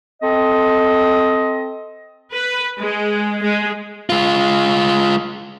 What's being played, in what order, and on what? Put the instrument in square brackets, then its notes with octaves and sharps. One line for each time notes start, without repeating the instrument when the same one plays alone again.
[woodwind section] C4 A4 D#5
[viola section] B4
G#3
G#3
[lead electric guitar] G#3 F4